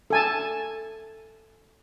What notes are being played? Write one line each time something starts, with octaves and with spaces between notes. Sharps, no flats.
A4 G#5 A5